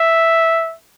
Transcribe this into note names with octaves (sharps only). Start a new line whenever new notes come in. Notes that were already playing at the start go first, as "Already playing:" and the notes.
Already playing: E5